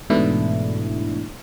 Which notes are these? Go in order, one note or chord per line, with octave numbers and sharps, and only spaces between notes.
G#2 B2 E3 A3 D4 E4